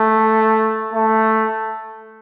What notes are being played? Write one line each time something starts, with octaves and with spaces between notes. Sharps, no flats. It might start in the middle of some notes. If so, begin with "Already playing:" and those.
Already playing: A3
A3